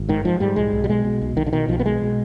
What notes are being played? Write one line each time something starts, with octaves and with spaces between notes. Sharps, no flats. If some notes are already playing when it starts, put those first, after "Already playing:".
Already playing: G#1
G#2 D#3
G#2 F3
G#2 G3
B1 G#3
B1
G3
B2 G#3
B2
B1
B1 D#3
D3
B2 D#3
B1 F3
B3
B2 G#3
B2